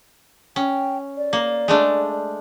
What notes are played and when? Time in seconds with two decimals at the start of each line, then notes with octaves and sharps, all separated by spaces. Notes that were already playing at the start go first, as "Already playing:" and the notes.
0.56 C#4 G5
1.17 D5
1.33 A#3
1.68 G#3 A3 D4